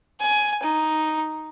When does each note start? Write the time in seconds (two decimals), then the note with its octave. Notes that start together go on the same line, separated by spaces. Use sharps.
0.21 G#5
0.63 D#4